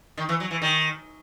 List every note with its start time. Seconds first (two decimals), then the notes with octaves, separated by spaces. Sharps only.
0.17 D#3
0.29 E3
0.40 F#3
0.51 E3
0.62 D#3